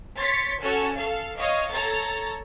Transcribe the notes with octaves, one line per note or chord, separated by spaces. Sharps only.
C#5 C6 A6 B6 C#7
C#4 F#4 A4 C#5 A5
A4 F5
C#5 D#5 F5 D#6
A4 C#5 A#5 A6